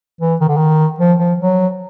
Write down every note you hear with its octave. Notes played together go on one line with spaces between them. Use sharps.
E3
D#3
D3
D#3
F3
F3
F#3